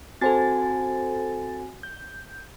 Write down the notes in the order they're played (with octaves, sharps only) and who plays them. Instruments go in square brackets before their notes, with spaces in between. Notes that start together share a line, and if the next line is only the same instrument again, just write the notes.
[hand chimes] C4 F#4 G#5 [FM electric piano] A4 C5 A6
[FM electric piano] G6